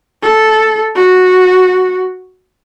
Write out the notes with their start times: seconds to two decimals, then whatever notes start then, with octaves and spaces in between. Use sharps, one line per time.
0.23 A4
0.96 F#4